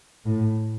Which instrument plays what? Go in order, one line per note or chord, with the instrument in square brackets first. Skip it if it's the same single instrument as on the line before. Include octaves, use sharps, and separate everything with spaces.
[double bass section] A2